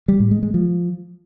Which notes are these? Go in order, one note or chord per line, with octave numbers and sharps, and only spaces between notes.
G3
A2
G#3
G#3
F3